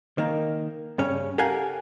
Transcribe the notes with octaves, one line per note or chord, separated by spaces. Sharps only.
D#3 A#3
G2 C#3 C#4
G4 A4 A#4 F5 F#5 G#5